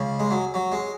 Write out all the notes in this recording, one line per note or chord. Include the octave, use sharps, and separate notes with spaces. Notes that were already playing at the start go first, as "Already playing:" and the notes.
Already playing: C#2 C#3
G#3
F#3
F#3
G#3